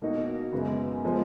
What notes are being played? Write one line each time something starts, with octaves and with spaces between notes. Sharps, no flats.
B2 A#3 D#4 F#4
F#2 C#3 G#3 B3
F3 G#3 B3